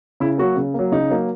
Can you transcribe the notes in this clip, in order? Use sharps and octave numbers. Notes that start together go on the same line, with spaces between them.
C#3 E4
F#3 A#3 F#4
C#3
F#3 A#3
C#3 D#4
F#3 A#3